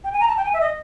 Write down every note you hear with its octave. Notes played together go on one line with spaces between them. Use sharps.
G5
G#5
A#5
A5
G5
G#5
E5
D#5